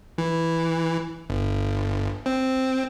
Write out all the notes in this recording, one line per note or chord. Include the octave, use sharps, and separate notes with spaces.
E3
G1
C4